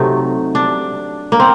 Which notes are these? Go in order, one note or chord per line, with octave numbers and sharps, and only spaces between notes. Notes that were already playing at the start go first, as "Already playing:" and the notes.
Already playing: C3 F#3 A3 D#4
D4
A#3
C4